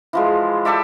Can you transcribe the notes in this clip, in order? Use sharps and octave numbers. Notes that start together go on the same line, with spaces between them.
E3 F3 G#3
G4 A4 D5 E5